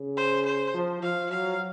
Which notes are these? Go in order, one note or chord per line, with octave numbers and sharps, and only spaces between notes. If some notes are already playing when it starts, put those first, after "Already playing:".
Already playing: C#3
C5
C5
F3
F3 F5
F#3 F5